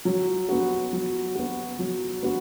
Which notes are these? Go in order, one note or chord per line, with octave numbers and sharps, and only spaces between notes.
F#3
B3 F#4
F#3
B3 F#4
F#3
B3 F#4